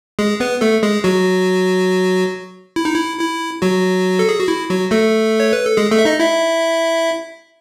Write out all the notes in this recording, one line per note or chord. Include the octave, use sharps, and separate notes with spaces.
G#3 G#4
B3 B4
A3 A4
G#3 G#4
F#3 F#4
E4
D#4
E4
E4
F#3 F#4
A4
G#4
F#4
E4
F#3 F#4
A3 A4
C#5
B4
A4
G#3 G#4
A3 A4
E5
D#4 D#5
E4 E5